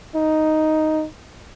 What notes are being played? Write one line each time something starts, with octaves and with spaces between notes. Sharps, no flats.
D#4